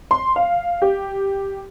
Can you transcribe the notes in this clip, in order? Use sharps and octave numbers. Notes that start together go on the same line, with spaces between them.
C6
F5
G4